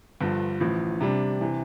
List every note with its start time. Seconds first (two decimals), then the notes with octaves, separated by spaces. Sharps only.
0.21 G1 G2 D3 F3
0.61 A1 A2 F3
1.01 C3 G3 D4
1.41 C3 E3